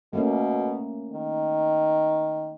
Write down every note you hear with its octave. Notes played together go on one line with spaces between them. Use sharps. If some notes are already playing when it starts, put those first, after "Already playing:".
B2 A3 A#3 C#4
D#3